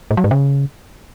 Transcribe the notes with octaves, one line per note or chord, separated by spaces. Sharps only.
A2
F#3
G#2
C#3